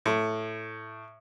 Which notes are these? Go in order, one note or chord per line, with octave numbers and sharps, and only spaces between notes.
A2